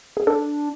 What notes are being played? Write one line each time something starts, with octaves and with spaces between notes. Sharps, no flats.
G#4
D4 A4